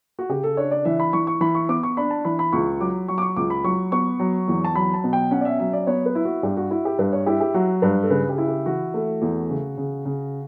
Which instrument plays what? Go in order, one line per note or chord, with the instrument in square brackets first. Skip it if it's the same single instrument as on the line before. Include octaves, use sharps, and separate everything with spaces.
[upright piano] F#4
C#3 G4
A4
D4 C#5
D5
E3 E5
B5
E3 C#6
C#6
E3 B5
C#6
B3 D6
C#6
D4 B5
A5
E3 B5
B5
C#2 C#6
F#3 D6
F#3 C#6
D6
C#6
C#2 D6
B5
F#3 C#6
B3 C#6
F#3
E2
A5
F#3 B5
A5
B2
G5
C#4 F#5
D5
E5
F#3 E5
D5
B3 C#5
B4
E4
F#4
G2 G4
F#4
E4 F#4
G4
G2 B4
C#5
E4 G4
G4
F#3 F#4
G2 B4
A4
C#3 B4
G4
E4
G4
E3 F#4
A3
E2
C#3
C#3
C#3